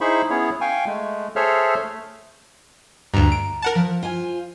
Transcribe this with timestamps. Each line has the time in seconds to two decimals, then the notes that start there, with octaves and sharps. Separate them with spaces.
0.01 D#4 E4 G#4 C5 B5 C#6
0.30 B3 C#4 E4 G#4 C#5
0.61 F5 G5 G#5 C#6
0.87 G#3 A3
1.36 G#4 A4 C5 C#5 E5 F6
1.84 A3
3.14 D2 G2 A#5
3.32 D7
3.62 A#4 F#5 A5
3.75 F3
4.03 F4 C5 G#5